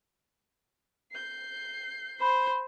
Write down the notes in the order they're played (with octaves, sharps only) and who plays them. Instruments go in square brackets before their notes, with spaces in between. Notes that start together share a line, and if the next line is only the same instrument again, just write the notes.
[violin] G6 C7
[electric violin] C5 [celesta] B5